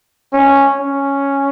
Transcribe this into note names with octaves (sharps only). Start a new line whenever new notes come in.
C#4
C#4